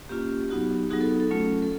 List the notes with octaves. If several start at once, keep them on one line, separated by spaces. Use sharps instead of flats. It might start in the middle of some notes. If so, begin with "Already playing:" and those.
A#3 C#4 F4 G4
F#3 B3 D#4 F#4
F#3 B3 D#4 F#4 G#4
A4
A4
F#3 A3 C#4 F4
A4